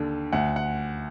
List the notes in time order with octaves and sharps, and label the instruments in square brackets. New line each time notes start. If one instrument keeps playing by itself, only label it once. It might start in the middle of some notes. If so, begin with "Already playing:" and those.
Already playing: [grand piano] D#2 D3
D2 F#5
F#5